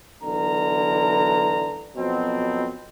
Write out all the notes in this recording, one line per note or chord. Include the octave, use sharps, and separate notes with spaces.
B1 D3 E3 A#4 A#5
F2 B2 F#3 C4